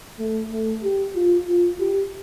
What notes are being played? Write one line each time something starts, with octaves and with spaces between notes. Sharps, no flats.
A3
A3
G4
F4
F4
G4